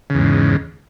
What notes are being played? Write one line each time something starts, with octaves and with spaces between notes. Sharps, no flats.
E2 G#2 C#3